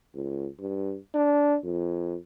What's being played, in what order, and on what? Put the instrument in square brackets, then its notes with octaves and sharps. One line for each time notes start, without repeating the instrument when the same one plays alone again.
[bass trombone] C#2
G2
D4
F2